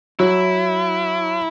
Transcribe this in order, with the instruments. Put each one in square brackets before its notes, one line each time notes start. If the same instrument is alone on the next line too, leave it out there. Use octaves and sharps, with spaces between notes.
[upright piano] F#3 [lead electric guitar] E4